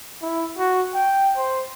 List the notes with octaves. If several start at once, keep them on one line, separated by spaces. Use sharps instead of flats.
E4
F#4
G5
C5